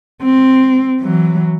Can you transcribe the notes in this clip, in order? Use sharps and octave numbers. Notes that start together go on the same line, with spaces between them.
C4
E3 F#3